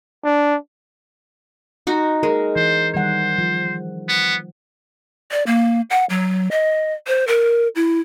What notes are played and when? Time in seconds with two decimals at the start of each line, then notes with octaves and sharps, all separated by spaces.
0.24 D4
1.87 D#4 F#4
2.23 G#3 A#4
2.56 E3 C5
2.94 D#3 G3 C5 F#5
3.38 F3
4.09 B3
5.32 D5
5.47 A#3
5.90 F#5
6.10 F#3
6.51 D#5
7.07 C5
7.27 A#4
7.75 E4